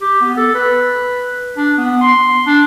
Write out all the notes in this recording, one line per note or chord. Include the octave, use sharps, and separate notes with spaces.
G4
B3
A4
B4
D4
B3
C6
D4